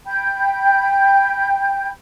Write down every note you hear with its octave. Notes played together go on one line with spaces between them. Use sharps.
G5 B5 G6